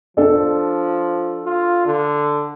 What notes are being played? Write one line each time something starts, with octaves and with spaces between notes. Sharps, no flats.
F3 D4 A4 D5
F4
D3